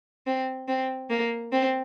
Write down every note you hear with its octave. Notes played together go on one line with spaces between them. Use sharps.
C4
C4
A#3
C4